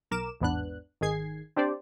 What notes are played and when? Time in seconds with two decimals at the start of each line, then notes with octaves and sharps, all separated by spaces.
0.11 B1 A#4 D6 E7
0.41 A1 E2 G#2 B3 D4 F#6
1.01 G#1 D#3 G#4 G#6 C7
1.56 C4 D4 G4 C5 D5